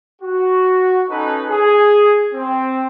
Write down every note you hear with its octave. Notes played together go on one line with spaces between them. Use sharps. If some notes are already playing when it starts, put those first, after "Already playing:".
F#4
C#4 D#4 A4 B4
G#4
C4